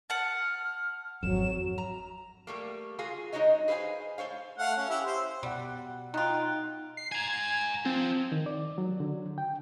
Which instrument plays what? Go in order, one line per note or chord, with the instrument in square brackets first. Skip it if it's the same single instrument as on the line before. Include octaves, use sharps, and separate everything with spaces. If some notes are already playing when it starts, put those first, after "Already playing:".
[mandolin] F#5 A5 [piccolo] F6
[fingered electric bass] G#1 F2 [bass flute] F#3 [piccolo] E7
[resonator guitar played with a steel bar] A#5
G3 A3 A#3
F4 F#4 G#4 F5
G#3 D#4 E4 F#4 C#5 D#5
G#4 B4 C5 F5 G#5
A3 C5 C#5 F5
[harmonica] A3 F5 F#5
C#4
E4 G4 E5
C5
[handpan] B2 F#5 [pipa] G3
[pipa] B2 F4 [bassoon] D#4 [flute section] G5 C6 F#6
[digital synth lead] C7
[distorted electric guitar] G#5 A#5 [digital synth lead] G#6
[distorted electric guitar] F3 [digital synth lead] C4
[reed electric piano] D#3
D5
F#3
D3
G5